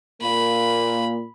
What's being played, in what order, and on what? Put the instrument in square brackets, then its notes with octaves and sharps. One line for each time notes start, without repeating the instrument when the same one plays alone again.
[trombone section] A#2 A#3 [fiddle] B5